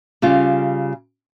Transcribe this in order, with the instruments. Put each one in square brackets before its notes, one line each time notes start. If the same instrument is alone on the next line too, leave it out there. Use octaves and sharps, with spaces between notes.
[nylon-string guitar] C#3 G3 F4